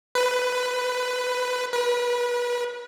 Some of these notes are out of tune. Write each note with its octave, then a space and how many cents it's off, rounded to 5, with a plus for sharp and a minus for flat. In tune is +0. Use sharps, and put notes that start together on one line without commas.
B4 +15
B4 -30